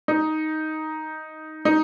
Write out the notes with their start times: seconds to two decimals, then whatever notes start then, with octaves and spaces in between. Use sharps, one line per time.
0.08 D#4
1.65 D#4